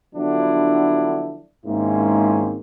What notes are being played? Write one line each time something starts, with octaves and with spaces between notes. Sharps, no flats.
D3 F3 F#3 B3 D4 E4
G#1 G#2 A#3 C4 C#4 E4